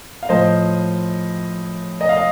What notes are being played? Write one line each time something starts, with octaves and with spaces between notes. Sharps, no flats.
F5
A2 F3 C5 D#5
D#5
F5
D#5